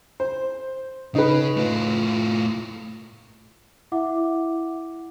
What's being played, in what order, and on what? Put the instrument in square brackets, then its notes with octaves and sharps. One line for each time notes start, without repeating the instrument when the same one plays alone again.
[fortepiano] C5
[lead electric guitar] C#3 [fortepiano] D#4 B4
[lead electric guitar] A2 F4
[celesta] E4 E5 F#5 D6